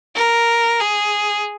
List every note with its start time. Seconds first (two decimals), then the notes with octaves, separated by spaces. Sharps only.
0.16 A#4
0.81 G#4